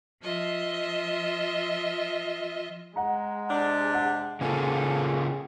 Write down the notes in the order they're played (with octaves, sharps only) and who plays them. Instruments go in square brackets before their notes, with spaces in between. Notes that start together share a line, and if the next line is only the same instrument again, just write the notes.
[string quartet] F3 F4 D#5 E5
[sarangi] G#3 [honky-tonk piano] F#5 A#5
[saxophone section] C3 D4
[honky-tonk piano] F#5
[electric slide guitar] C#3 A#3 F4 [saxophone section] F3 A4 [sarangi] G#4 [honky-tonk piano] G#5